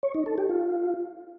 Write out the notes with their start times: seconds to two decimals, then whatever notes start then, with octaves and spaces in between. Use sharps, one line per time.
0.03 C#5
0.14 D#4
0.26 A4
0.38 G4
0.49 F4